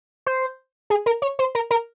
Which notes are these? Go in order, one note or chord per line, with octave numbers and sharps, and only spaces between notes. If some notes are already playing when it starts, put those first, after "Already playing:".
C5
G#4
A#4
C#5
C5
A#4
A#4